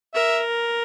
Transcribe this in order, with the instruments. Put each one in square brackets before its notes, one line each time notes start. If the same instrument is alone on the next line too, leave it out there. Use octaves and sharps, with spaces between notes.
[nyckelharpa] A#4 [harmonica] E5